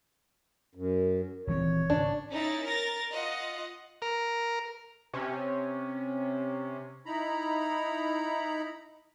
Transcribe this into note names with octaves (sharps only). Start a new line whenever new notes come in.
F#2
D#1 E3 C4 C#5
G#1 C#3 C#4 D4
C#4 D#4 E4 A6
A#4 A6 A#6
F4 D#5 F#5
A#4
C3 C#4
D#4 E4 A#5 B5